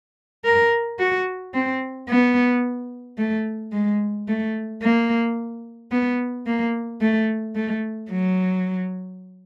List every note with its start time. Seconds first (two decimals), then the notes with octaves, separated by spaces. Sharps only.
0.45 A#4
0.99 F#4
1.54 C4
2.09 B3
3.18 A3
3.73 G#3
4.28 A3
4.82 A#3
5.91 B3
6.46 A#3
7.01 A3
7.56 A3
8.11 F#3